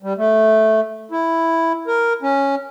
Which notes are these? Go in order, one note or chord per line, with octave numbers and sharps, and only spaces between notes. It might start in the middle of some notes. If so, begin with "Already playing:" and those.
G3
A3
E4
A#4
C#4